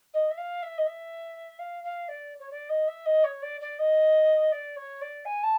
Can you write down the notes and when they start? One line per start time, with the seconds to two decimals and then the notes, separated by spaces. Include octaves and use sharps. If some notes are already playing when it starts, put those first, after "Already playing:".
0.13 D#5
0.30 E5
0.37 F5
0.62 E5
0.78 D#5
0.86 E5
1.59 F5
1.84 F5
2.08 D5
2.39 C#5
2.51 D5
2.69 D#5
2.87 E5
3.05 D#5
3.24 C#5
3.42 D5
3.60 D5
3.79 D#5
4.52 D5
4.76 C#5
5.01 D5
5.25 G#5
5.43 A5